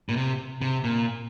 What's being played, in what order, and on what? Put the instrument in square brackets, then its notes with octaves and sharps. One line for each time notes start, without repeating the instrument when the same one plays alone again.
[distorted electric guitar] A#2
C3
C3
A#2